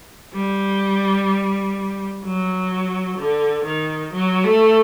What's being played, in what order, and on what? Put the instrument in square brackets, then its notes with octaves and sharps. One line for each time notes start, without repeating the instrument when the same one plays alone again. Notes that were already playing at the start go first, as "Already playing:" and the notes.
[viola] G3
F#3
D3
D#3
F#3
A3